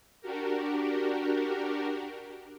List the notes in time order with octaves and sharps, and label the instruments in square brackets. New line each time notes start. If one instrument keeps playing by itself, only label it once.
[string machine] D4 F#4 G4 A#4